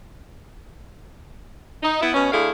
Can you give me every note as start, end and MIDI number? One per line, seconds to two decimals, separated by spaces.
1.83 1.99 63
2.01 2.13 59
2.01 2.13 64
2.14 2.30 47
2.14 2.30 61
2.32 2.50 50
2.32 2.50 57
2.32 2.50 64
2.32 2.50 68
2.32 2.50 77